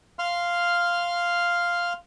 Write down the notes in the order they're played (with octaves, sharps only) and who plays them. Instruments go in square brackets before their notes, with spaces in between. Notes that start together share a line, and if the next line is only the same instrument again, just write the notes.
[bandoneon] F5 C6 F6